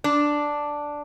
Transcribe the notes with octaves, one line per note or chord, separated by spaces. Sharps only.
D4